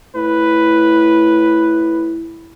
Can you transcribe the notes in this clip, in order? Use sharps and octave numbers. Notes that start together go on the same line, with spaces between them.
A2 B4